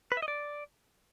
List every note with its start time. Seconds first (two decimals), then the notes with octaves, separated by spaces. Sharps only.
0.12 B4
0.17 E5
0.22 D#5
0.28 D5